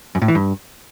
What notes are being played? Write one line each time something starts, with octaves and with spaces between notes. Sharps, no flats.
F#2
A2
E3
G2